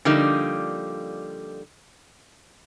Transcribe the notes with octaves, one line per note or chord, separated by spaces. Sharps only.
D3 F3 G3 A#3 D#4